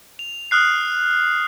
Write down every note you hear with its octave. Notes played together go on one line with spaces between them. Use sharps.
F7
D#6 F6 F#6 C7